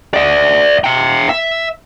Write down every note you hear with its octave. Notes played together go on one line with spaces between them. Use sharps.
D5 E5
E5 G5
E5